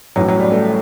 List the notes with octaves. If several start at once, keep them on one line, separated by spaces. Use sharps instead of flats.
A1 A2 E3 F#3
F#3
G3
A3